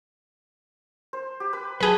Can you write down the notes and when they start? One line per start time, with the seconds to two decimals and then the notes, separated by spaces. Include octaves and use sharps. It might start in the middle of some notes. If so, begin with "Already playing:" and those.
1.13 C5
1.40 G4
1.53 B4
1.80 F#3 G#4 A4 B4